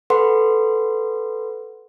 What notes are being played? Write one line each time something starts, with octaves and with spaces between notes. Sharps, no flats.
A4 B4 F#5 C6